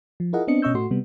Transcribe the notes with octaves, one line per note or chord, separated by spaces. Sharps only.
F3
E4 F4 G#4 A#4 D#5 F#5
B3 C4 D4 D#5 C#7
B2 C#4 D#5 C#6 E6 G6
A2 A3 F#4 C6
C3 G3 B3